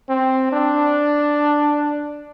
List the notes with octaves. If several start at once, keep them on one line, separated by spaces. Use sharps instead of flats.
C4
D4